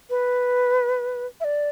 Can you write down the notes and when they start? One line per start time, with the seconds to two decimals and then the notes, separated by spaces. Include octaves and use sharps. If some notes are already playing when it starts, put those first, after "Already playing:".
0.10 B4
1.40 E5
1.44 D5